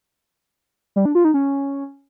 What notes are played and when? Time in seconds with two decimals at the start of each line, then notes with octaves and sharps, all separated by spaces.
0.96 G3
1.05 D4
1.15 F4
1.25 D#4
1.34 C#4